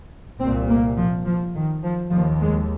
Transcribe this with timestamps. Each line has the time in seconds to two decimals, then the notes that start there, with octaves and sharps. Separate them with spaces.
0.39 C2 A#2 C4
0.68 A#3
0.96 F3
1.26 F3
1.54 D#3
1.83 F3
2.11 D#2 F3
2.40 G#3